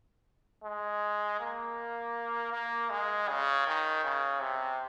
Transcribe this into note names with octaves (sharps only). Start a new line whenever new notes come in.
G#3
A#3
A#3
G#3
C#3
D#3
C#3
C3